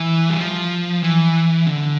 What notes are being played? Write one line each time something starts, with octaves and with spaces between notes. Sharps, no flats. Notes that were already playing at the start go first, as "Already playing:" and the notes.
Already playing: E3
G3
F3
E3
D3